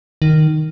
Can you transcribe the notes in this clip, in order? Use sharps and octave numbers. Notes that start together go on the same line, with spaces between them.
D#3